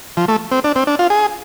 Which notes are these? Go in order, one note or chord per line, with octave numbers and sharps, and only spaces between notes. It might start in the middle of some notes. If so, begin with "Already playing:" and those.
F3
A3
C4
D4
C4
D4
F4
G#4